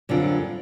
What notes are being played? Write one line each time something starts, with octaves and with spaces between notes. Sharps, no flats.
F#2 D3 G3 C4 F4